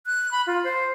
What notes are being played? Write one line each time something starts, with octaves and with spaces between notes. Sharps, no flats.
F#6
B5
F4
C5